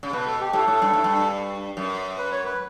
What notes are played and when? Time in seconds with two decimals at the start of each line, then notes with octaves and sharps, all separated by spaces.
0.03 C#3
0.13 B2 B4
0.27 A4
0.40 G4
0.53 A2 A4
0.68 A2
0.82 G2
0.93 A2
1.04 G2
1.77 F#2
2.18 B4
2.31 C#5
2.45 B4